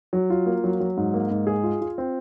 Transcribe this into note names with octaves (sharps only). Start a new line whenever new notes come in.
F#3
F4
A#3
F#3
F#3
G#2
A#3
G#2
G#4
F4
F4
C4